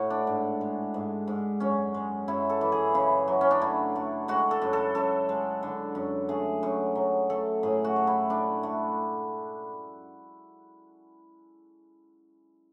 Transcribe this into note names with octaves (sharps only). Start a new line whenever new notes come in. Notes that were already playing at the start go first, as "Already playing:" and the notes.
Already playing: A2 F#4
D4
G#2
G#3
G#2
G#2
F#2 C#4
G#3
F#2 E4
A4
E3
G#4
C#3 E4
F#3
C#4
D4
A3 E4
A3
G#3 F#4
A4
F#2
A4
F#2 A4
G#3
D3
F#2
A3 G#4
F#2
F#3
A3 A4
A2 G#4
F#4
A3
E4
A3 D4
A3